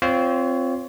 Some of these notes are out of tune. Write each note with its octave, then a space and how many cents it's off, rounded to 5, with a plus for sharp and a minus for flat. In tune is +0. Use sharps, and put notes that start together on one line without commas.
C4 +0 F4 +0 C#5 +25